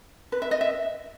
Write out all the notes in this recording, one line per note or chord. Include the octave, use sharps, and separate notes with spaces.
B4
E5
D#5
E5